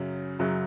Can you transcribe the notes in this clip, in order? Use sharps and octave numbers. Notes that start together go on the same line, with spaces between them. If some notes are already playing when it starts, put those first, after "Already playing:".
Already playing: F#2 C#3 F#3
F#2 C#3 F#3